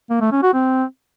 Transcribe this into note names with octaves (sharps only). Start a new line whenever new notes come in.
A#3
A3
C#4
F#4
C4